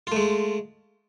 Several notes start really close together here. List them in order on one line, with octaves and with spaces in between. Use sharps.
F4 A3 G#3